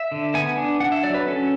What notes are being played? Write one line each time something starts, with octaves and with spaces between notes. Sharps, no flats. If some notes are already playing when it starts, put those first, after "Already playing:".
Already playing: E5
D3
B3 G#5
D4
D4 F#5
E5
F#3 D5
B4
C#4 A4